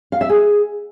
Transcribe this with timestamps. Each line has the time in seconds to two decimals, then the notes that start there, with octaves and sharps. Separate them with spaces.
0.12 F5
0.21 E5
0.29 G#4